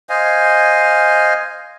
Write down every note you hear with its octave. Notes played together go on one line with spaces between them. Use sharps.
C5 D#5 F5 G#5